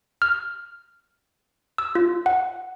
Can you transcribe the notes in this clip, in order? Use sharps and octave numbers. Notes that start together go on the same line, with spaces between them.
F6
E6
F4
F#5